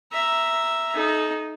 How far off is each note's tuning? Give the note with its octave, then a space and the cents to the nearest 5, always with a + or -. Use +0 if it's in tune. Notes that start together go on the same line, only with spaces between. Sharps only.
E5 +0 A#5 +0
D#4 +0 A4 -40